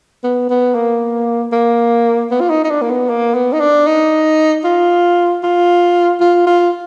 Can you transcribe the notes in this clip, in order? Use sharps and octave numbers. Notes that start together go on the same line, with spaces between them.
B3
B3
A#3
A#3
B3
F4
D#4
D#4
D4
A#3
B3
A#3
B3
D#4
D4
D#4
F4
F4
F4
F4